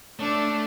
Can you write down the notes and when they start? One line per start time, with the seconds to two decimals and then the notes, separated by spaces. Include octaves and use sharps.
0.19 A3 D4